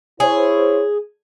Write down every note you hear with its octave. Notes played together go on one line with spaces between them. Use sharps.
E4 G#4 C5 C#5